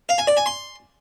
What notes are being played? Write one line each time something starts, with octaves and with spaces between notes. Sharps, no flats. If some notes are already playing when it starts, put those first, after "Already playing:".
F5
G#5
D5
G#5
C6